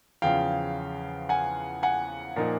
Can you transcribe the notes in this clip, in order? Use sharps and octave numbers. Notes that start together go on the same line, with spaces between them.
E2 C#3 F3 F5 G5
F#5 G#5
F#5 G#5
A#2 F3 A#3 D#4